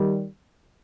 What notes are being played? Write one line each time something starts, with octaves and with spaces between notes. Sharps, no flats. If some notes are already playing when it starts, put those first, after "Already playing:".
Already playing: D#3 G3